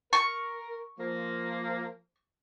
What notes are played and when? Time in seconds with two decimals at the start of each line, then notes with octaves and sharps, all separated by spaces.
0.13 A#4 C#6
1.00 F3 A#3